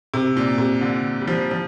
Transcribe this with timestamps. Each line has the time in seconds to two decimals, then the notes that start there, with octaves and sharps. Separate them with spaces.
0.14 C3
0.37 A#2
0.58 C3
0.81 D3
1.21 G3
1.28 F3
1.51 F3